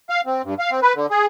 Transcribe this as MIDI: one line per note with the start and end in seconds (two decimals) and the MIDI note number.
0.10 0.21 77
0.26 0.42 60
0.44 0.54 43
0.59 0.71 77
0.71 0.80 60
0.82 0.93 71
0.95 1.06 50
1.11 1.26 68